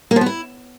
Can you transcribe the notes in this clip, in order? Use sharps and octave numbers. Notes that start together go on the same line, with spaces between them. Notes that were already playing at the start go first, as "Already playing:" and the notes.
A#3
F3
B3
E4